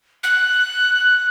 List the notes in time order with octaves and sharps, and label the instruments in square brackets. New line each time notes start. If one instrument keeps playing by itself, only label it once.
[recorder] F#6